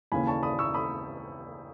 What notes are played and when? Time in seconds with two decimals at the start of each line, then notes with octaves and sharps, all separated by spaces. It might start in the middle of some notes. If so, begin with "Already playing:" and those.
0.12 D#2 C#3 E3 G#5 B5
0.27 A5 C#6
0.43 B5 D#6
0.59 C#6 E6
0.74 B5 D#6